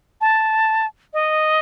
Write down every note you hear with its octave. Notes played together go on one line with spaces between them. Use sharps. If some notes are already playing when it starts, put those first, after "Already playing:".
A5
D#5